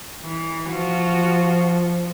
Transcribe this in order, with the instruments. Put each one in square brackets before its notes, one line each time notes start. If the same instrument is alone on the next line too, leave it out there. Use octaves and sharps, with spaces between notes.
[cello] E3
[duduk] F3 [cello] F4 F#4